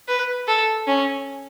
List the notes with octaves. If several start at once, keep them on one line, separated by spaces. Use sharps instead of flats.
B4
A4
C#4